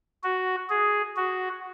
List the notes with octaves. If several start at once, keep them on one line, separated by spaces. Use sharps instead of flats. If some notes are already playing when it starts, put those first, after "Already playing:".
F#4
G#4
F#4